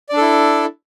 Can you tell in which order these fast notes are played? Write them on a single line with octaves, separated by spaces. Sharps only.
D5 D4 A4 E4